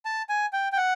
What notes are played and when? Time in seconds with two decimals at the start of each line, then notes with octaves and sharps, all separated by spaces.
0.05 A5
0.29 G#5
0.53 G5
0.72 G5
0.77 F#5